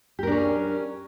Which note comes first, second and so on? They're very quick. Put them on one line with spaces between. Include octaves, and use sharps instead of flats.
G4 A#4 D4 C#4